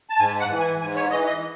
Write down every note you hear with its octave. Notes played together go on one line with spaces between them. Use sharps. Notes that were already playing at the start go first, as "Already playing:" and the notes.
A5
G#2 G#5
F#5
E3
G#5
G#2 G#5
C#5
E3 D#5
D#5